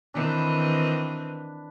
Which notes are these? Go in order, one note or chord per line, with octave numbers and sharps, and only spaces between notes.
D#3 E3 C4 D4 B4